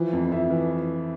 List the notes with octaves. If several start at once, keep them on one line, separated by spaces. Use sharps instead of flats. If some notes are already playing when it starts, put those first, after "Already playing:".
Already playing: E3 F3
F2
F2 E5
E3